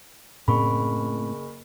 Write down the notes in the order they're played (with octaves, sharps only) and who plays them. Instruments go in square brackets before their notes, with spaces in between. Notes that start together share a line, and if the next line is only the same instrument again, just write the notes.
[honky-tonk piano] F#1 [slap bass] A2 C4 [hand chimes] B5 C#6